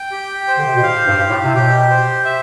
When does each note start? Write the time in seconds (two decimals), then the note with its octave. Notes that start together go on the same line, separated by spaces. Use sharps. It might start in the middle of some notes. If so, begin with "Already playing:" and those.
Already playing: G5
0.11 G4
0.48 C5
0.57 D3
0.66 C3
0.75 B2
0.83 A2 F5
1.07 G2
1.18 G4
1.30 A2
1.43 C3
1.54 B2 G4
1.90 C5
2.25 E5